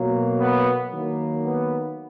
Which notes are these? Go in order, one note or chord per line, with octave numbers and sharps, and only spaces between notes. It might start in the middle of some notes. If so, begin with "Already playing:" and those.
Already playing: B2 F#3 A#3
B3
D#3 F#3 A#3
B3